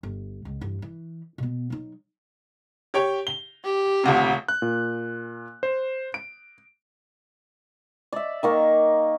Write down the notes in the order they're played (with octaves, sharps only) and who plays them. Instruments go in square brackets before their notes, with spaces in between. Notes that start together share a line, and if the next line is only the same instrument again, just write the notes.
[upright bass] G1
C#2
G2 E3
E3
B2 B3
F#3 D#4
[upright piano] G4 C#5 G5
G7
[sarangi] G4
[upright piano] D#1 D2 C3
[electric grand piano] F#6
A#2
C5
D7
[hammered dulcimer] D5 E5
D#3 A#3 C#6